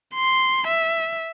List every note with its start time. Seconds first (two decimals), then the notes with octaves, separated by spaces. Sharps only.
0.14 C6
0.67 E5